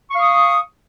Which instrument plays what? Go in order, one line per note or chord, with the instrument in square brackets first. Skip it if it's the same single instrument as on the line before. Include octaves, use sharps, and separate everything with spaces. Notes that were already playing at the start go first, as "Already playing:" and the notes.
[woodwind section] C#6
F5
D#6